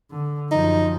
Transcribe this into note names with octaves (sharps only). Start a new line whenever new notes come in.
D3
F#2 F3 D#4